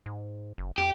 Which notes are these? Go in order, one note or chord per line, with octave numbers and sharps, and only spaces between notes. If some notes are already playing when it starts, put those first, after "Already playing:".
G#2
F#1
F2 G4